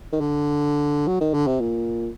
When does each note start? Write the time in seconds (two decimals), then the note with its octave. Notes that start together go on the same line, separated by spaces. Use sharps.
0.13 D#3
0.21 D3
1.08 F#3
1.21 D#3
1.34 D3
1.47 C3
1.60 A#2